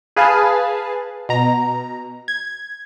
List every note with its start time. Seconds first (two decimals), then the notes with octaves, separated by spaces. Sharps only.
0.17 G#4 B4 F5 G#5 A5
1.29 B2 A#5
2.28 G#6